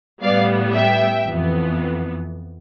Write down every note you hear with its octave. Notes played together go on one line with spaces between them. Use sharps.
A2 G3 B3 D5 F5
E5 G5
F2 E3 B3